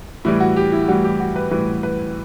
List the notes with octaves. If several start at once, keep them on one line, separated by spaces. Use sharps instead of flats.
A2 E3 G3 E4
F#4
G4
E4
A2 E3 G3 F#4
G4
F#4
B4
A2 E3 G3 B4
B4